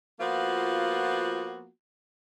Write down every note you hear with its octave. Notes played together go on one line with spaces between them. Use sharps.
F3 A#3 B3 F4 F#4